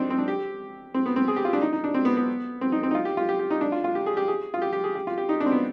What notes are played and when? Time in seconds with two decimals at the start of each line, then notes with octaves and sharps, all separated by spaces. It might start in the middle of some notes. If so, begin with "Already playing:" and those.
Already playing: C4 D4 D#4
0.10 C4
0.18 D4
0.28 G4
0.94 C4
1.06 B3
1.16 C4
1.28 G#4
1.36 G4
1.45 F4
1.53 D4
1.62 D#4
1.73 D#4
1.84 D4
1.94 C4
2.05 B3
2.17 B3
2.61 C4
2.72 D#4
2.83 C4
2.91 D#4
2.95 F4
3.05 G4
3.17 F4
3.29 G4
3.39 G4
3.51 D#4
3.61 D4
3.72 F4
3.84 F4
3.95 G4
4.06 G#4
4.17 G4
4.28 G#4
4.54 F4
4.62 G4
4.73 G4
4.84 G#4
4.95 G4
5.07 F4
5.18 G4
5.29 D#4
5.40 D4
5.46 C4
5.52 B3